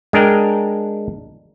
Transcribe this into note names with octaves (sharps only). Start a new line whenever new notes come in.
G#3 D4 A#4 G5